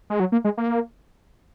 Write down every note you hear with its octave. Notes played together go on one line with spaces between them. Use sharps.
G#3
F#3
A#3
G#3
A#3